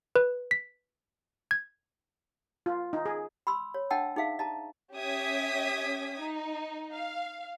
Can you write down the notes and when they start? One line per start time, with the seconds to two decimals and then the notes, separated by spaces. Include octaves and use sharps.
0.16 B4
0.51 B6
1.51 G#6
2.66 F4
2.93 D#4
3.06 G#4
3.47 B5 C6 E6
3.74 C#5
3.91 D4 D#5 F#5 G5 A5 E6
4.16 D#4 G#4 E5 F5
4.39 D#5 A5 A#5
4.93 C#4 G4 E5 D#6 G#6 B6
6.20 D#4
6.93 F5